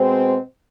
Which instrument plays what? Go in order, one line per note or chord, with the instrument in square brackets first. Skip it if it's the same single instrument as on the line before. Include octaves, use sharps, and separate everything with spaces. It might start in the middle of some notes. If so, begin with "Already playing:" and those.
Already playing: [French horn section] B2 G#3 C4